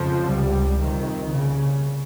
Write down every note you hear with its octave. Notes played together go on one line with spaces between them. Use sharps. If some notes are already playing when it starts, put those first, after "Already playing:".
Already playing: F2 C#3 F3
C#2 C3 G3
F2 C3 D#3
C2 A#2 C#3